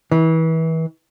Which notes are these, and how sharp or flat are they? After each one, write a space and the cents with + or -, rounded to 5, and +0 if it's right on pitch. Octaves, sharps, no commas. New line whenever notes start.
E3 -30